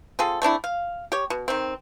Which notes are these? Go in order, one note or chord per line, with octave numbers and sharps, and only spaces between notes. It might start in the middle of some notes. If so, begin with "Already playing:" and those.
C4 F4 G#4 A4
A3 C4 D4 E4
F5
G4 C#5
B2
D#3 C4